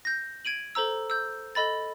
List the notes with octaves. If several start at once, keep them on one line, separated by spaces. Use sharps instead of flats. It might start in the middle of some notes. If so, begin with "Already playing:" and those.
G6 A#6
G#6 D7 D#7 F#7
A4 C5 A#5 E6
E6 G6
A4 D#5 B5 A6